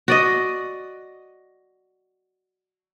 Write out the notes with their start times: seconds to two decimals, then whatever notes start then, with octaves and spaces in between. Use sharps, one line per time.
0.08 F#4 D5 D#5